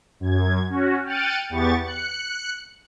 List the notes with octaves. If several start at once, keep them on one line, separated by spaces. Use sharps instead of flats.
F#2 G#6
C#4 F#4
G5 F6 F#6 A6 C#7 D#7
E2 B3 G4 C#6 A6
F#6 C#7